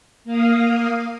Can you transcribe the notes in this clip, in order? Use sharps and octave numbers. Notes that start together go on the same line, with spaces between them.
A#3 F5 D#6